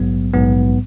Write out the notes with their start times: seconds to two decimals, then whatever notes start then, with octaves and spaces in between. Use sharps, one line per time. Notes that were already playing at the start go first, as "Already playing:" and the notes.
Already playing: A#1 G#2 F#3 B3
0.34 A#1 G#2 F#3 B3